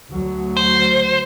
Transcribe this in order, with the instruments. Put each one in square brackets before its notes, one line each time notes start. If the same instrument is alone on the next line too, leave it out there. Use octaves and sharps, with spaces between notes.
[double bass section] D2 F#3
[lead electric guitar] C5